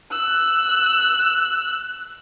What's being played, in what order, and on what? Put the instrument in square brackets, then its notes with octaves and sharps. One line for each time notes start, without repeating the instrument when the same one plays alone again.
[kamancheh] E6 F#6